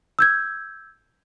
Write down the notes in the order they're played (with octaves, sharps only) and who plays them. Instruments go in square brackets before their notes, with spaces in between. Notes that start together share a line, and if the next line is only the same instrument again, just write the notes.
[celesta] E6 G6 G#6